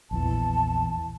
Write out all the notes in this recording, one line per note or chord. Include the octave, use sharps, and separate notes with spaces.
A#1 E2 E3 A5